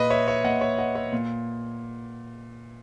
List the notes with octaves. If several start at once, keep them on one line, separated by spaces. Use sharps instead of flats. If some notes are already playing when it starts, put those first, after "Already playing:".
Already playing: A#2 B4 D#5
C#5 E5
C#5 E5
A#2 D#5 F#5
C#5 E5
D#5 F#5
C#5 E5
A#2